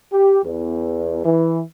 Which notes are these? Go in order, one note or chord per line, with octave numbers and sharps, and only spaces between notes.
G4
E2
E3